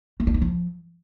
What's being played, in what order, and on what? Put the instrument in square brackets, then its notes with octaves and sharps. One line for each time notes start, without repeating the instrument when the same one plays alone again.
[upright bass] A3
D4
D#4
F3